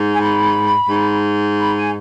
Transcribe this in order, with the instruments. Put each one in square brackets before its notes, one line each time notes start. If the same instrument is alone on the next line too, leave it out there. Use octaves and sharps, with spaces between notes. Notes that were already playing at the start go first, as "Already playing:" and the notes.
Already playing: [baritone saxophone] G#2
[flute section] G#5
B5
[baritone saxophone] G#2
[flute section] B5
G#5